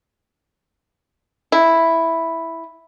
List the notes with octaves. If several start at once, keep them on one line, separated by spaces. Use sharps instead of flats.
E4